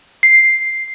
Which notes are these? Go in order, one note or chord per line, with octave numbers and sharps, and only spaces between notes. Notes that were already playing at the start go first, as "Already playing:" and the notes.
C7